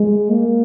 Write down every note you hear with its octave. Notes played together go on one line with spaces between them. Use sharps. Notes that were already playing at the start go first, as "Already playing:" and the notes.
Already playing: G#3
A#3